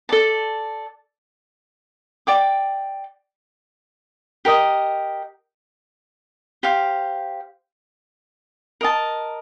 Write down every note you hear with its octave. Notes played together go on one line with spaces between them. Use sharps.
A4 D5 A5
D5 G5 D6
G4 A#4 D#5
G4 C5 F5
A#4 D#5 A5